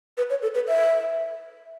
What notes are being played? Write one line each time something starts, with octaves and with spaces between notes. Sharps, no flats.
B4
C#5
A4
B4
E5